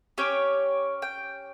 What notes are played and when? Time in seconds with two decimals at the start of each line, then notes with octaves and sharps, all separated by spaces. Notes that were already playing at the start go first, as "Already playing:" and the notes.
0.18 C#4 G4 C#5
1.02 G5